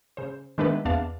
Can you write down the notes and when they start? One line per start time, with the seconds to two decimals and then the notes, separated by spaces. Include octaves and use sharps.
0.17 C#3 C5
0.58 D#3 G#3 B3 D4 E4 B4
0.85 E2 B3 D4 F5